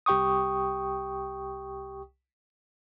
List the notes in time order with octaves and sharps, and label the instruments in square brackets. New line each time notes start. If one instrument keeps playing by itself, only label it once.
[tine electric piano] C2 G4 G5 C#6 D#6